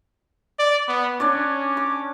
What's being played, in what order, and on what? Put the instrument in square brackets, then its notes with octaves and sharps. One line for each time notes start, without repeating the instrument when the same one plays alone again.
[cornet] D5
B3
[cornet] C#4 [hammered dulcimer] D4 C#5 D5
[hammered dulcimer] D6